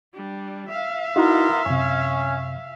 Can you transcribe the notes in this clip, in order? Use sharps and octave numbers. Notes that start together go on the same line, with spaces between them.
G3 D4
E5 F5
B3 D#4 E4 F#4 A#4 C6
F#2 C3 C#4